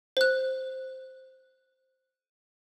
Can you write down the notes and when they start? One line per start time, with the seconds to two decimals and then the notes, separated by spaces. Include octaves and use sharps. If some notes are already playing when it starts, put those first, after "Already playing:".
0.17 C5 F#6